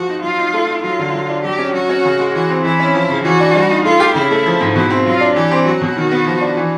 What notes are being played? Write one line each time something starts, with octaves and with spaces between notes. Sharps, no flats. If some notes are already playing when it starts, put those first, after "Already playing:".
Already playing: F3 F#4
D#4
F#3 F4
D#4
A3
D#4
F#3 F4
D3
F#3
D4
F#3 G4
C#4
F#3 F#4
C#4
C#3
G#3
E3 F#4
C4
E3 E4
C#4
F3
C#3
E3 F#4
D4
G3
D#4
A3 F4
G4
C#3 E4
A3
F3
G#2
B2 E4
C4
F#3 F4
D4
E3 G4
C4
F#3 F#4
B2
D#3
B3
F3
D4
E3